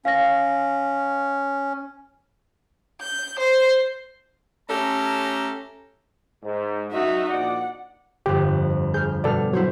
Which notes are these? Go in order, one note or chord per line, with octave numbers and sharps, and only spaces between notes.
C#4 F5 A#6
G6
C5
A3 C#4 G4 A4 A#5
G#2
F#2 D#4 F#4 E5
A#1 D5 F#5
G1 F2 G4
G#4 F6 G6
B2 G3 A4 D5 F6
F#3 E4 C5 C#5